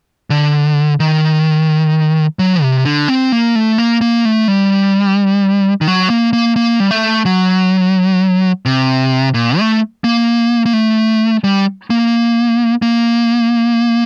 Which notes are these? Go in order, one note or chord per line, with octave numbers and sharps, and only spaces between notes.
D3
D#3
F#3
C3
D3
C4
A#3
A3
A#3
A#3
A3
G3
D#3
F#3
A#3
A#3
A#3
G3
A3
F#3
C3
A#2
A3
A#3
A#3
A3
G3
A#3
A#3